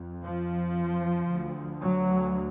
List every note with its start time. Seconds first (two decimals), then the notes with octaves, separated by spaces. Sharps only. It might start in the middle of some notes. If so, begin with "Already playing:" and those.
Already playing: F2
0.23 F3
1.29 D2
1.83 F#3